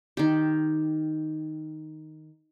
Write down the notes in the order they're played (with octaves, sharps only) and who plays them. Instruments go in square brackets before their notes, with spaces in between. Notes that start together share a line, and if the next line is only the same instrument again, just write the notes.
[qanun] D#3 G4